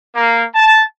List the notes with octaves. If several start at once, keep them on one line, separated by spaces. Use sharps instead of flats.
A#3
A5